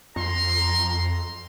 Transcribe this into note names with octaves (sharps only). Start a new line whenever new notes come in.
F2 A#5 C6